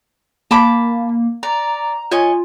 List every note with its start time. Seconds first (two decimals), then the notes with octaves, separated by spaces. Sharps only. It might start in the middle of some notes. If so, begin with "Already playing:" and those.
0.51 A#3 A5 B5 D6
1.43 D5 A#5
2.11 F4 C#5 D#5 G#5